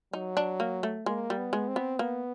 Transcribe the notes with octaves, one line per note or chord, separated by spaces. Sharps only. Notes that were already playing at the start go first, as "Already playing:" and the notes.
F#3 D#4
D4
A#3
A3
G#3 A#3
G3
B3
G#3
C4
B3
A#3 B3